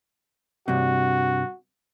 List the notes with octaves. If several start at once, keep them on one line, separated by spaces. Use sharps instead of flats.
G2 C3 F#4